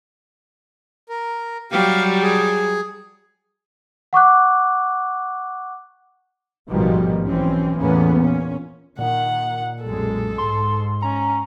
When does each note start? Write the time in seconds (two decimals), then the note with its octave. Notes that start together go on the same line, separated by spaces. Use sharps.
1.09 A#4
1.72 F#3 G3 G4 F5
2.23 G#4
4.13 F#5 C#6 D6 F#6
6.70 A1 G#2 B2 D#3 F3 G3
7.24 B1 E3 C4 C#4
7.79 E2 A2 A#3 B3 C#4
8.18 A#2 C#4
8.99 A#2 D#3 F#5
9.83 B1 F#2 G#3 A4
10.38 G#2 C6
11.02 C#4 A#5